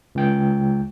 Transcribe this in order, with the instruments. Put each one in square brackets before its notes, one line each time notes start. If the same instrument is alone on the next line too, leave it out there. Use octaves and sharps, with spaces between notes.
[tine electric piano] C#2 G5